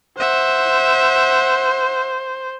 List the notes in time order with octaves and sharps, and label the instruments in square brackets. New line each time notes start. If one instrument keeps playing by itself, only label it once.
[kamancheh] C5 [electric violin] E5 F#5